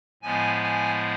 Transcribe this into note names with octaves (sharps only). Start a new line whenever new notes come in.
A2 F3 G#3 B3 G#5
G#5